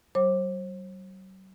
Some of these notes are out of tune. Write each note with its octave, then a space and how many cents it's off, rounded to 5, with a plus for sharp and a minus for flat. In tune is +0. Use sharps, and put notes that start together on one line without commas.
F#3 +45 C5 +40 D6 +5